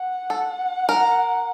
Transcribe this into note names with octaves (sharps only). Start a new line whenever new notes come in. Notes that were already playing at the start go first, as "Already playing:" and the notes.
Already playing: F#5
A4
A#4